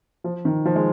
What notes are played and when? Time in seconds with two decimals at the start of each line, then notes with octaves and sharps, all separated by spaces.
0.24 F3
0.45 D#3
0.65 F3
0.76 G#3